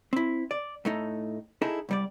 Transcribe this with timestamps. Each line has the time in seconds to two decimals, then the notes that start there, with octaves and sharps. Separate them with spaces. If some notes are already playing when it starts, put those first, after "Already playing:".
0.13 C4 E4
0.51 D5
0.85 A2 A3 D#4
1.62 D#4 E4 G#4 A4
1.89 C2 G3 D5